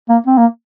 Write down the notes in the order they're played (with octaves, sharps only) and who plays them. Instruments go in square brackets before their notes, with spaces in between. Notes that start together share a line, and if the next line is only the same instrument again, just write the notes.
[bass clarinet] A#3
C4
A#3